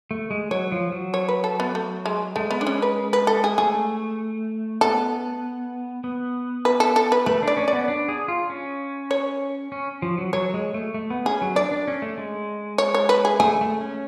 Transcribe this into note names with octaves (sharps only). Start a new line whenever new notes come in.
A3
G#3
F#3 C#5
F3
F#3
C#5
B4
A4
B3
A3
G#3
G#3 A3
B3
D4
C#4
B4
B4
A4
G#4
A3 G#4
B3 A4
B3
B4
A4
A4
B4
A3 B4
D4 D5
C#4
D5
B3
D4
G#4
F4
C#4
C#5
C#4
F3
F#3
F#3 C#5
G#3
A3
A3
B3
C#4 G#4
F#3
D4 D5
D4
C#4
A3
G#3
C#5
C#5
B4
G#4
A3 G#4
A3
C#4